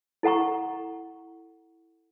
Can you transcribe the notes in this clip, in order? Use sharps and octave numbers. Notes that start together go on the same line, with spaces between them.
E4 A4 F#5 A#5 C#6